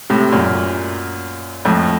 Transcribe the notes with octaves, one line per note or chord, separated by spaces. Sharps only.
A2 C3
F#2 A#2
F2 A2